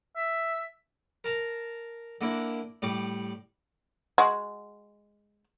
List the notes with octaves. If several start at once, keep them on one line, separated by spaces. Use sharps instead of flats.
E5
A#4 A5 A#5
D3 A#3 D4 E4
A2 G3 D5 D6
G#3 F#4